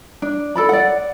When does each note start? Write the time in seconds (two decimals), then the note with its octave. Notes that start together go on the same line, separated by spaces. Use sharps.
0.22 D4
0.56 A4 D5 B5
0.69 D5 F#5